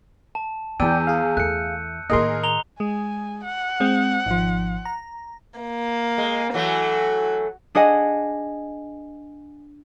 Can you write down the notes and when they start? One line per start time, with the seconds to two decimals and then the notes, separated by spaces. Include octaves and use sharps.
0.35 A5
0.80 E2 E3 B3 D5 G5 E6 G6 D#7
1.07 G#4 F5
1.37 E2 A3 F#6 C#7
2.10 A2 D#3 A#3 G#4 A#4 D#5 C6
2.43 A#5 F7 G7
2.80 G#3 G#5
3.44 F#5
3.80 G#3 C4
4.26 G#1 F3
4.85 A#5
5.58 A#3
6.18 G#3
6.54 E3 F#3 A3 F#4
7.75 D4 G#4 D#5 F#5 G#5